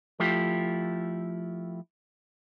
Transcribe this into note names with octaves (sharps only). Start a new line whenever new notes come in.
F3 A3 E4 F4 G4